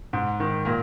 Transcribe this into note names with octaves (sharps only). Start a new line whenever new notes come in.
G#2
D#3
A#2 A#4